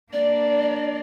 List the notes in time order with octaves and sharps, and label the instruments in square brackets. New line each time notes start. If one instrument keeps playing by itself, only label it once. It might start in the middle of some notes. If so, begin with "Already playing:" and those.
[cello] A#3 D4 [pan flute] D5